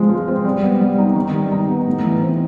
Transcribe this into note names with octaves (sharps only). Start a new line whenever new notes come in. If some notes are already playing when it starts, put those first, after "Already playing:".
Already playing: F3 G#3 C4
F4
C4
G3
B3
G3
D#4
D#3
G3
D#4
B3
A2
E3
C4